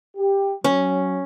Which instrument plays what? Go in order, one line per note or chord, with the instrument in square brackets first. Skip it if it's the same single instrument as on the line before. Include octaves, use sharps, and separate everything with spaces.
[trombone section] G4
[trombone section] F#3 [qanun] C#4